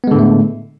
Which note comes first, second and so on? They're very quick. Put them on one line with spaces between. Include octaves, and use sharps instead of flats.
B3 G#3 D3 A2 A3